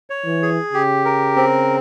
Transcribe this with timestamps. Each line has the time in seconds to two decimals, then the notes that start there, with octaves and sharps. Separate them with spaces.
0.10 C#5
0.26 E3
0.42 G#4
0.73 C#3 G4
1.05 A#4
1.36 C4